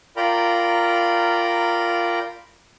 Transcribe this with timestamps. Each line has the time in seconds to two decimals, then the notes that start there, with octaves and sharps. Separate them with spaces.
0.17 F4 A#4 D5 G5 A#5 B5